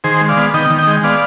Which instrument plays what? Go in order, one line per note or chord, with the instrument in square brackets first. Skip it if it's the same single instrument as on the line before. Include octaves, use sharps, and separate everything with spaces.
[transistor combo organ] D#3 G#4 C5
G#3
D5 F5
B3
D#3 D#5 G5
D#3
D#5 G5
G#3
B3 D5 F5